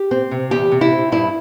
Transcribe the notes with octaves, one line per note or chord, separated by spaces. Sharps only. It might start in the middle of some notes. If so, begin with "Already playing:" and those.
Already playing: G4
C4
C3
E2 G4
C3
E4
C4
G2 E4